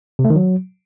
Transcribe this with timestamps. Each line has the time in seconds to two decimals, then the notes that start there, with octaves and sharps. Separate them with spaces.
0.19 C3
0.25 A3
0.30 D#3
0.36 F#3